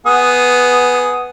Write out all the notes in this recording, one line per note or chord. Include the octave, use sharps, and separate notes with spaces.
B3 G#4 D#6